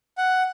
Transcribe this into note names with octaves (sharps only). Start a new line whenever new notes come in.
F#5